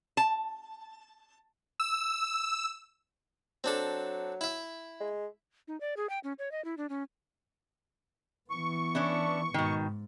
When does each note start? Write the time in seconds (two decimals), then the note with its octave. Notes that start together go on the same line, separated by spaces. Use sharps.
0.17 A5
1.80 E6
3.64 F#3 C4 D4 A4
4.41 E4 E5
5.00 G#3
5.68 D#4
5.81 D5
5.97 G#4
6.09 G5
6.24 C#4
6.39 C#5
6.52 D#5
6.65 E4
6.77 D4
6.89 C#4
8.50 E3 B3 C#6
8.95 C#4 D4 E4
9.54 G#2 B2 D#3